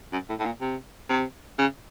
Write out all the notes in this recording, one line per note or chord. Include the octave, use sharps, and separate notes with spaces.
F#2
A2
A2
A#2
C3
C3
C#3